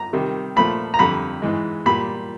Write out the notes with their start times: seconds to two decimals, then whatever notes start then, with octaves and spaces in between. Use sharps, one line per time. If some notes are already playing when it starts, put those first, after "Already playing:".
Already playing: A#5
0.13 C3 D#3 G3
0.56 A#2 F3 A3 B5
0.94 A#5
0.99 F2 D3 G3 B5
1.42 G#2 E3 G#3
1.86 A#2 G3 B5